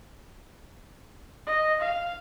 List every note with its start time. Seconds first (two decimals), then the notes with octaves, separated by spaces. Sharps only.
1.47 D#5
1.81 F5